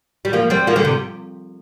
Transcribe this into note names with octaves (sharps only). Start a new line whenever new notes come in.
G3
F3 A#3
G3 C4
F3 A#3
D3 G3
C3